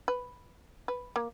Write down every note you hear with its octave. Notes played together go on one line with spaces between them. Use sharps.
B4
B4
A#3